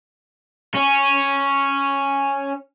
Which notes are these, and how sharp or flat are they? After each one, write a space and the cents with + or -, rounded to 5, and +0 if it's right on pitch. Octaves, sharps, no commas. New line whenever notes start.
C#4 -5